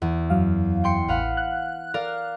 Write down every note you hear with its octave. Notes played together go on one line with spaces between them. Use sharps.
E2
F#2 F#3 F5
G5 C6 C#7
A1 B4 F5 F#5
F#6
A#4 D5 F5